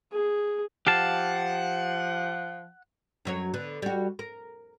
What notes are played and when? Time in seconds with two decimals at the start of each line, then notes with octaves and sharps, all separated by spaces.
0.12 G#4
0.87 F3 G4 F5 F#5 A5
3.25 F#2 F#3 C#5
3.54 D3 B3
3.82 G3 F#4
4.19 A#4